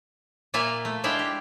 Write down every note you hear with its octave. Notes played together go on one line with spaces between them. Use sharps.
A#2 A#3 F4 E5 G#5
A3
G#3 D4 E4 E5 F5 G5
G4